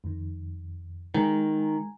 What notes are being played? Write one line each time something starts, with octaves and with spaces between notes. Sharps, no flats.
F2 D#3
D#3 G#3 G#5 A#5